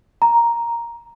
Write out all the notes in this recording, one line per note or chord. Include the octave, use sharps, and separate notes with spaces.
A#5